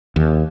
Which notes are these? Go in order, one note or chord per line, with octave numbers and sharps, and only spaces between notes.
D#2